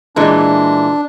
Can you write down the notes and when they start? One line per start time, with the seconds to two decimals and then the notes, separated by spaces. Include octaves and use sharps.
0.16 A#2 E3 G#3 D4